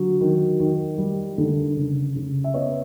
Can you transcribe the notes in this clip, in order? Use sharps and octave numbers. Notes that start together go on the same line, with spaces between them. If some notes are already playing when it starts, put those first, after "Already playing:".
Already playing: D3 F#3
D#3
D#3
G3
D3
C#3
C#3
E5
B3 C#5 D#5